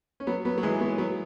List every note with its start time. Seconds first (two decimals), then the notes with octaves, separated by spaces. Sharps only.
0.20 C#4
0.27 F#3 B3
0.45 F#3 B3
0.58 F#3
0.63 E3 G#3
0.80 F#3 B3
0.98 F#3 B3